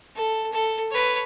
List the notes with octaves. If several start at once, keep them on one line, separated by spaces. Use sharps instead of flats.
A4
A4
B4 C#5